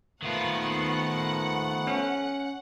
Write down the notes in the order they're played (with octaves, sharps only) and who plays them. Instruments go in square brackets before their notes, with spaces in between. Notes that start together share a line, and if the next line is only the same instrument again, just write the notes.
[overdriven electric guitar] D#3 F4 [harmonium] F3 A3 B3 [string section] F#5
[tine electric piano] C#4